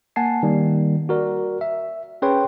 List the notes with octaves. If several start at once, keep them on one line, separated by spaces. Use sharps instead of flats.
A#3 F#5 G#5 A5 C7
D#3 G3 A#3
F#4 A#4 D5
E5
C#4 G#4 B4 C#5 G5 C6